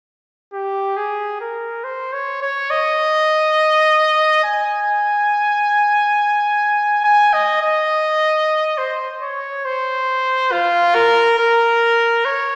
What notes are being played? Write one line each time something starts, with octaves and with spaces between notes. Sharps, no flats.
G4
G#4
A#4
C5
C#5
C#5
D#5
G#5
G#5
D#5
D#5
C5
C#5
C5
F4
A#4
A#4
C#5